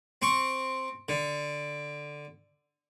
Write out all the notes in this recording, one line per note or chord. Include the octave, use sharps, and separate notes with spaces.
C4 C#6
D3